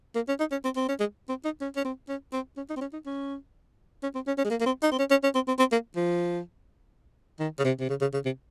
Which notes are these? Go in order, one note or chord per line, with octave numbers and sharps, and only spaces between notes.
A#3
C#4
D#4
C#4
C4
C4
C#4
G#3
C4
D#4
C#4
C#4
C4
C#4
C4
C#4
D#4
C4
C#4
D#4
C#4
C#4
C4
C#4
C#4
G#3
A#3
A#3
C4
D#4
C4
C#4
C#4
C#4
C4
C4
C4
A#3
F3
D#3
C#3
C3
C3
C#3
C#3
C#3
C3